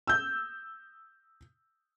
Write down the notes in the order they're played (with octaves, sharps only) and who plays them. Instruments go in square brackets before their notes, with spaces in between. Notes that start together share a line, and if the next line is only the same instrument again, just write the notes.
[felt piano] E6 G6